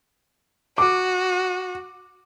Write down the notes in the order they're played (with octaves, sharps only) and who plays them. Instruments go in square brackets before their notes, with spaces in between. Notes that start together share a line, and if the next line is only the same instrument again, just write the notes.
[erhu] F#4 [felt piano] D6